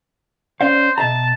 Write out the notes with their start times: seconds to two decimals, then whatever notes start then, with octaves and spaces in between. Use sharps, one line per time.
0.61 C#4 C5 D5 F5
0.98 B2 E5 A5 A#5